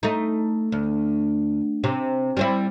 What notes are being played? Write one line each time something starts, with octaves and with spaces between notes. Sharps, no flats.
A3 D#4
D2
C3
G3 C4 E4